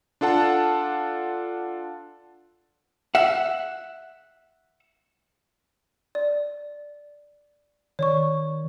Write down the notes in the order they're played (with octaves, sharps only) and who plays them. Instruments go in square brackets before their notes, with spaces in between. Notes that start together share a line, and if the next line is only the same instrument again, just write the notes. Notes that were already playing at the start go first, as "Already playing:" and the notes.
[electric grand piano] D4 F4 A4 F#5 A5
[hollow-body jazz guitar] E5 F#5
[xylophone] D5
[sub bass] D#3 [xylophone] C#5 D5 C#6